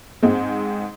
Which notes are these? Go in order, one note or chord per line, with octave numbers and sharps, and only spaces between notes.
G#2 G#3 C4